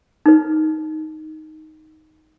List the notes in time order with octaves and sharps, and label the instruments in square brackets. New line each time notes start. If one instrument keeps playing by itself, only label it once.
[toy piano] D#4 B4